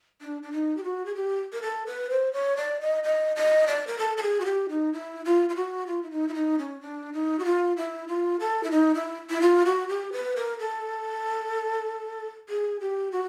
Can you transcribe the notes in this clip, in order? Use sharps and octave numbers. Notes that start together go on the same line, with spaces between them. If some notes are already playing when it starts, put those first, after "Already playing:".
D4
D4
D#4
G4
F#4
G#4
G4
A#4
A4
B4
C5
C#5
D5
D#5
D#5
D#5
D5
A#4
A4
A4
G#4
F#4
G4
D#4
E4
F4
F4
F#4
F4
E4
D#4
E4
D#4
C#4
D4
D#4
F#4
F4
E4
F4
A4
E4
D#4
E4
E4
F4
F#4
G4
B4
A#4
A4
G#4
G4
F#4